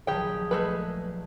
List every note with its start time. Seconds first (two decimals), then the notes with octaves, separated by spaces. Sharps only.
0.07 A#1 D#3 F#3 G4 G#4 G5
0.51 G#3 A3 B4